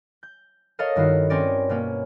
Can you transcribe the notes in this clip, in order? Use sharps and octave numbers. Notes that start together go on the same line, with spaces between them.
G6
A4 A#4 C#5 D#5 F5
G2 D#3 E4 F#4 C7
C4 C#4 A#4 D5
B2 A#3 C#4